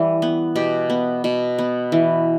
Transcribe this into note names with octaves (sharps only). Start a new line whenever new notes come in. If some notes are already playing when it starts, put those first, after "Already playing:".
Already playing: E3 G3
B3
B2 G4
B3
B2
B3
E3